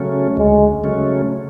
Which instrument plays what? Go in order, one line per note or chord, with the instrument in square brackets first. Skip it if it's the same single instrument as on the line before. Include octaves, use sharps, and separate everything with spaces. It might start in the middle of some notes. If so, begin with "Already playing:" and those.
Already playing: [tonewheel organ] C#3 F#3 A3 C#4
[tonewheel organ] D2 [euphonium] G#3
[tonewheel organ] C#3 F#3 A3 C#4